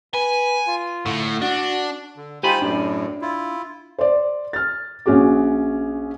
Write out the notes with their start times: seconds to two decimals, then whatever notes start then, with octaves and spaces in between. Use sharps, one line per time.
0.14 B4 G#5
0.67 F4
1.06 A2 D3
1.42 D4 F#4
2.17 D3
2.43 D#4 F4 G4 C5 G#5 B5
2.62 F#2 A2 D4
3.22 E4 F4
3.98 C5 D5
4.53 F6 A6
5.06 A#1 C#4 F#4 G#4 D6